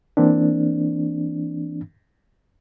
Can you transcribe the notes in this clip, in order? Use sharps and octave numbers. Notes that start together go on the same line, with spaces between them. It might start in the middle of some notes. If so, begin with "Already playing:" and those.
E3 A#3 C4 D4